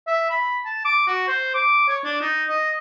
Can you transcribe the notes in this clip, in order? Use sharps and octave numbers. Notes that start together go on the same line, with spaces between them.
E5
B5
A5
D6
F#4
C5
D6
C#5
D4
D#4
D#5